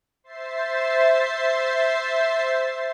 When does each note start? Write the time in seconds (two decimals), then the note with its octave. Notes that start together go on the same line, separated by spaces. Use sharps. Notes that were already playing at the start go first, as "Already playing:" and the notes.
0.24 C5 E5 A6 C7